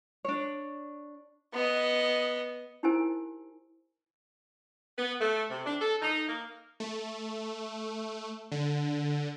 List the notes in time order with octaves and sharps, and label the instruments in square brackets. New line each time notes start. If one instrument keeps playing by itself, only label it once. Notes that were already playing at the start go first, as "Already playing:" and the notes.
[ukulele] D4 C#5
[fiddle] B3 D#5
[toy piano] D#4 E4 G4 A#4 C5 G#5
[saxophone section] B3
A3
C3
D4
A4
D#4
A#3
[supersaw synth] A3
D3